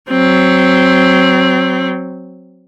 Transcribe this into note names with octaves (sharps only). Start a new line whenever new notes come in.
F#3 C4